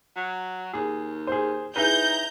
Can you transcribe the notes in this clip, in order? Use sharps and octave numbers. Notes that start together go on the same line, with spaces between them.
F#3
D#2 G#4
G#4 C5
D#4 E4 G#4 B4 A#5 G6